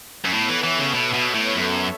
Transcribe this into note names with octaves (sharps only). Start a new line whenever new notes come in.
F#2
A2 B3 A4 C#5 E5
E3
E3
C#3
B2
B2
A2
F#2